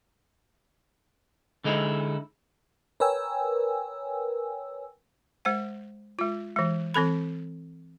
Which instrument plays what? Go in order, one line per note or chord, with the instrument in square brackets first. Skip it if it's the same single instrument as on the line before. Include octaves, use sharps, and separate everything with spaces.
[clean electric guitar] D3 G#3 D#4 E4
[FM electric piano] A#4 B4 C#5 G5 G#5 E6
[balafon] G#3 C5 F#5
G#3 F4
E3 G#3
E3 C4 A4 B5